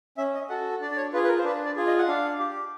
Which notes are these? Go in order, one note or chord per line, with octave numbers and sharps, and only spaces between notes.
C#4 E5
D#5
F#4 A4 F#5
D4 D5
D5
C#5
F4 G#4 B4
B4
A#4
C5
D4 B4
D5
F4 G#4
D#5
F#5
D4 F5
G4